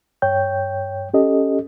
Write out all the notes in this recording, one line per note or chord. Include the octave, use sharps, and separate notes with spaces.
G2 C#5 G5 G6
C#4 G4 A4 D#5